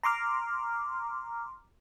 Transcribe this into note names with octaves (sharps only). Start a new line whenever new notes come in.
A#5 C6 D6 F6